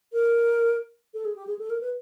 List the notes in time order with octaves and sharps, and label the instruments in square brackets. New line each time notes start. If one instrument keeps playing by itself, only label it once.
[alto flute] A#4
A4
G#4
G4
G#4
A4
A#4
B4